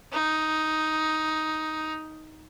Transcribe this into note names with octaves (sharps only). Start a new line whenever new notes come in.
D#4